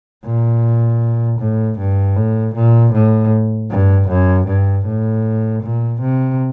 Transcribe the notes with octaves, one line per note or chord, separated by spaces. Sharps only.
A#2
A2
G2
A2
A#2
A2
G2
F#2
G2
A2
A#2
C3